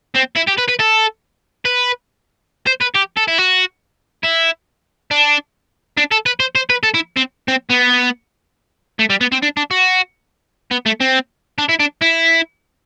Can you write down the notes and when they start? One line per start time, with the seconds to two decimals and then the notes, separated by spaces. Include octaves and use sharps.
0.15 C4
0.36 E4
0.47 G4
0.58 B4
0.68 B4
0.79 A4
1.65 B4
2.66 C5
2.81 B4
2.95 G4
3.17 A4
3.28 E4
3.38 F#4
4.24 E4
5.11 D4
5.97 D4
6.11 A4
6.26 B4
6.40 C5
6.55 C5
6.70 B4
6.83 A4
6.94 E4
7.16 C4
7.48 C4
7.70 B3
8.99 A3
9.10 G3
9.21 B3
9.32 C4
9.42 D4
9.57 D4
9.71 F#4
10.71 B3
10.86 A3
11.01 C4
11.58 D4
11.69 E4
11.80 D4
12.02 E4